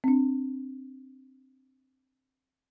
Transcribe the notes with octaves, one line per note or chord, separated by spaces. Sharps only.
C4 D4